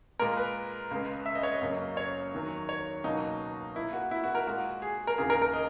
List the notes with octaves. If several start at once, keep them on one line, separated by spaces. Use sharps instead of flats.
A#2 G#3 A#4
B4
C#2 C#3 G#3
E5
D#5
C#5
D#5
F#2 C#3 F#3 A#3
C#5
E2 D#3 F#3
C#5
C#2 B2 F#3 A#3 D#4
A#2 A#3 E4
F#4
E4
F#4
A#4
A#2 G#3 F#4
G#4
A#4
D#2 C#3 E3 G#4
A#4
A#4
D#5